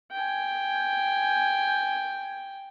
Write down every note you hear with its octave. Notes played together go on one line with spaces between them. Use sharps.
G5 G#5